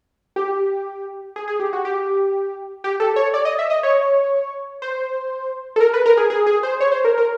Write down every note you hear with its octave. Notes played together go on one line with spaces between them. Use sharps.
G4
G#4
G#4
G4
F#4
G4
G4
A4
C#5
D5
D#5
E5
D#5
C#5
C5
A4
A#4
B4
A#4
G#4
G#4
G#4
C5
C#5
C5
A#4
A#4